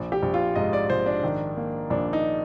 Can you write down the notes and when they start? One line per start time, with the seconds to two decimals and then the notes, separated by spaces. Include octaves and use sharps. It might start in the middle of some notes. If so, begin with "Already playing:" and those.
Already playing: A#1
0.12 G4
0.22 A#1
0.34 F4
0.56 G#2 D#5
0.73 D5
0.90 A#1 C5
1.06 D4
1.24 D#3
1.57 A#3
1.90 A#1 D4
2.13 D#4